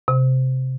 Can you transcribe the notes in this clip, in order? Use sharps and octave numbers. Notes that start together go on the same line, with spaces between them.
C3